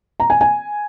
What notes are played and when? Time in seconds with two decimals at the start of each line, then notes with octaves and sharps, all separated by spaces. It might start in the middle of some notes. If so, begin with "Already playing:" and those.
0.20 A#5
0.30 G#5
0.41 G#5